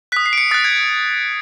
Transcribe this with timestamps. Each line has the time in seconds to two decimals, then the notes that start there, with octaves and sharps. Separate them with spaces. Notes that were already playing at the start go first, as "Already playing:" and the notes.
0.12 F#6 B6
0.17 D#6
0.26 C7
0.33 D7
0.38 C#7
0.51 D#6 A6
0.54 F#6
0.64 G#6